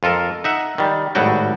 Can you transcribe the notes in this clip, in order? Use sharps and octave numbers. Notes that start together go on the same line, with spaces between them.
F2 F4 A4 A#4
D#4 E5 F#5
D#3 G3
G#1 A2 F#3 G3 F#4 G5